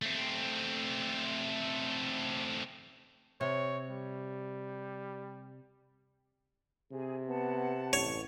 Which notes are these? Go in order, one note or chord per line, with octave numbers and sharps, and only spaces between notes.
A3 C4
C3 C#5
G3
C3 G#4
B3 F#5 A5
A1 C#5